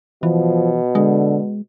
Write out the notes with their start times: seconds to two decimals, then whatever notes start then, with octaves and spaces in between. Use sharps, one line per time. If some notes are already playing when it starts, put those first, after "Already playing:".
0.23 B2 E3 F3
0.95 D3 G#3